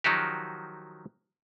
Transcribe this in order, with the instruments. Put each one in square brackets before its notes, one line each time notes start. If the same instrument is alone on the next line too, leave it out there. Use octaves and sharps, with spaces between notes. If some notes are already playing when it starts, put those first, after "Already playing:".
[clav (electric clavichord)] D#3 F3 F#3 D#4 F#4 G4